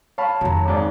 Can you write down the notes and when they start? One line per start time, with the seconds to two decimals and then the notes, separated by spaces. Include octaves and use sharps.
0.18 C#5 F5 A5 B5
0.41 F2 D#3 F#3
0.66 G#1 G#2 D5